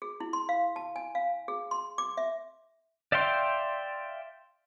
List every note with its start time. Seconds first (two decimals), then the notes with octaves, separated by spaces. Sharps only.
0.02 G#4
0.20 E4
0.33 C6
0.49 F5
0.76 A5
0.96 G#5
1.15 F5
1.48 G#4
1.71 C6
1.98 D6
2.17 E5
3.12 D5 E5 F5 G5 C6